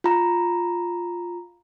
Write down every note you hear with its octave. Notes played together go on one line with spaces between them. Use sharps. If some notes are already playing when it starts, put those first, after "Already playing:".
F4 A#5